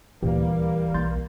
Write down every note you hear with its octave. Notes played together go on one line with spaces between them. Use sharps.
D#1 D2 A#2 E3 G3 A#3 G4
B1 C6 G6 A6